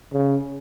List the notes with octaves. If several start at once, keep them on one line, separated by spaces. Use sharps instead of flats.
C#3